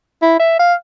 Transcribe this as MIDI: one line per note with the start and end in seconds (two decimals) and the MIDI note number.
0.22 0.35 64
0.40 0.56 76
0.59 0.74 77